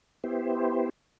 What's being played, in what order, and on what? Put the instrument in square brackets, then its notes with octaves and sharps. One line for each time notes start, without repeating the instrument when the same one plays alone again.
[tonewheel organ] B3 E4 G4 C5